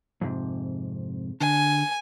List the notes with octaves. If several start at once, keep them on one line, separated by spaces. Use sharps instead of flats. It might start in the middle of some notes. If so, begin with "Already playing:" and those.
F2 G#2 C3
D3 G#5